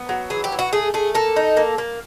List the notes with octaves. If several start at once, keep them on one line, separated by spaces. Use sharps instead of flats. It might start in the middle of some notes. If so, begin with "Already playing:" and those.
Already playing: B3
F#3
E3 G#4
G4
E3
F#4
A3 G#4
A3 G#4
A#3 A4
D#4
A#3
A#3